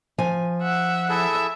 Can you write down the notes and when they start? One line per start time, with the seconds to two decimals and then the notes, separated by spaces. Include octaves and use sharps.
0.18 F3 G#5
0.62 E5 F#5
1.09 E4 G#4 A4 E5